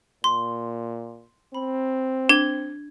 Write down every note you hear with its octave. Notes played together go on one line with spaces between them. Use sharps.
A#2 C6
C4 B5
D4 G#6 G7